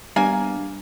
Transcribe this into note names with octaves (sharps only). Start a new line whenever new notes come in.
G3 A#3 B3 D4 G#5